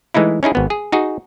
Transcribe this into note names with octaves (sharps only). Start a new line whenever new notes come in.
E3 G#3 A3 D#4 E4
C#4 D#4 E4 G#4
G#1 B3
G#4
D#4 F#4 G#4